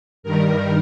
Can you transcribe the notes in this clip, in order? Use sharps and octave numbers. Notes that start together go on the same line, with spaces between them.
G2 D#3 G3 A#4